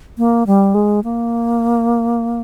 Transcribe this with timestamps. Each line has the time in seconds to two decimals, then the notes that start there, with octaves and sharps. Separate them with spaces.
0.18 A#3
0.47 G3
0.74 G#3
1.04 A#3